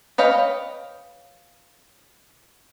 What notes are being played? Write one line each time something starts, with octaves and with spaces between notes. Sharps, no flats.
B4 C#5 D#5 F5 G5